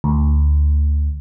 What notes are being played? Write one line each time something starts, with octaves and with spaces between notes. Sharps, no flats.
D2